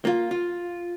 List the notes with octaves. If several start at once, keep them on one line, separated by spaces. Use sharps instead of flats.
A#3 F4
F4